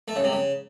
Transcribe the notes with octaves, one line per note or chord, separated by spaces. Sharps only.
A3
C#3
C3
C#3